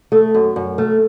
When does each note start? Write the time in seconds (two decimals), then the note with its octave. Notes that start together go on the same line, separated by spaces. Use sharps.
0.12 A3 A4
0.35 F#2
0.56 F#2
0.78 A3 B4